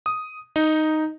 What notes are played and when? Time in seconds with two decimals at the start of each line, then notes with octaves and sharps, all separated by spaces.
0.06 D#6
0.56 D#4